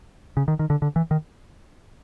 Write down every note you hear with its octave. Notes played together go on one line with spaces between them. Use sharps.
C#3
D#3
D#3
D3
D3
E3
D#3